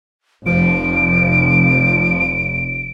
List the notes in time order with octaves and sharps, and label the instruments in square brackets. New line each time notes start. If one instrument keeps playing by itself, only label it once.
[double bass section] F1 [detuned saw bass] F3 [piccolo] D7